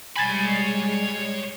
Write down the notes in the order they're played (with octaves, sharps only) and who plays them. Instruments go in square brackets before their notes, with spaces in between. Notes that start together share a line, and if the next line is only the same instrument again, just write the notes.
[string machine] G3 G#3 [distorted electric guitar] C#5 B5 [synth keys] G#5 G#6 A6